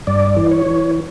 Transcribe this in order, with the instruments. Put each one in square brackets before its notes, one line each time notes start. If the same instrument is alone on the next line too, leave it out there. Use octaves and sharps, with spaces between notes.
[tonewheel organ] G2 D5
E3
C#5
E3